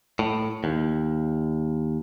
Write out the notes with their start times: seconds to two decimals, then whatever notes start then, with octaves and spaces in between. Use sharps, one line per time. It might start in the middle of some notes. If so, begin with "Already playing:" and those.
0.19 A2
0.64 D#2